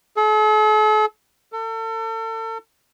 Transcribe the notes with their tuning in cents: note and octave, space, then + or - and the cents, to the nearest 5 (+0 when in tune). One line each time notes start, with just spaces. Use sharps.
A4 -45
A4 +35